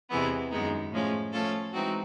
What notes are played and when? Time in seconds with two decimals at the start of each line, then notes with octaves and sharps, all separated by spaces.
0.09 E2 C3 E3 G#3 B3
0.51 F#2 D#3 G#3 B3 D#4
0.91 A2 F3 G#3 C#4
1.33 F3 A3 C#4 F4 A4
1.73 E3 G#3 C4 D#4 F#4